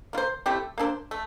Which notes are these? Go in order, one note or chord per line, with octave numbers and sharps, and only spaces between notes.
A#3 F4 C5
A3 C4 E4 G4
A#3 D4 A4 C5
A3